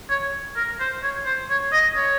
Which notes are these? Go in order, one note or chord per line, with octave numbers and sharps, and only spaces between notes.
C#5
A#4
C5
C#5
C5
C#5
D#5
C#5